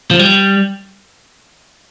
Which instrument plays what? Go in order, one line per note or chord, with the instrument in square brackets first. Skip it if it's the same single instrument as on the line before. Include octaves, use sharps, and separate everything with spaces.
[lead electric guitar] F3
G3